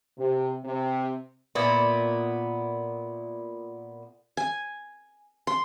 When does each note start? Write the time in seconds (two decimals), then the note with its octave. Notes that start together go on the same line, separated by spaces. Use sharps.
0.18 C3
0.65 C3
1.55 A#2 B3 E4
4.37 G#5
5.47 C6